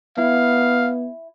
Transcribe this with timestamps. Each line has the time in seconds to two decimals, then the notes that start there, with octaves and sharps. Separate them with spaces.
0.17 B3 E4 F5